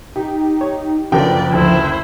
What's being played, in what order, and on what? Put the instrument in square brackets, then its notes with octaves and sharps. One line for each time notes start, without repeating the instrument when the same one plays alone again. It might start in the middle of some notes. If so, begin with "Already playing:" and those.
[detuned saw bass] D#4 [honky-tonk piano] G4
[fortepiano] C#5
[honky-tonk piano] F#1 A#4 G5 [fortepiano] D3 [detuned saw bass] F3 [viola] B4 D5
[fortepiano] D2 [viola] E4 C5